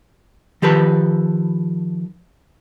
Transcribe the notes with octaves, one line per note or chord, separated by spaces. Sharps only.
D#3 F3 G4 A4 B4